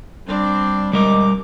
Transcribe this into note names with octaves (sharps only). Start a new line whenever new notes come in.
G3 C4 D4
G3 G#3 A#4 D6